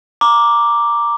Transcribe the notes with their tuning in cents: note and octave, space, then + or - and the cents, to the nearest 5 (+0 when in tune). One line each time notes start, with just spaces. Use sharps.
A#5 +0 D6 +0